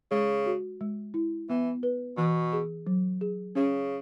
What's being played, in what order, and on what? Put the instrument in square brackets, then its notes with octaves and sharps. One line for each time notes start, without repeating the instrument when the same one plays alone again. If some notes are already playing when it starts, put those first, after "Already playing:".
[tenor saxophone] C#3 [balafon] G#3
[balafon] F#4
G#3
E4
[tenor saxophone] E3 [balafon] B3
[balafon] B4
[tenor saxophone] B2 [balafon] E3
[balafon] G#4
F#3
G#4
[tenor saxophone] C#3 [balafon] C#4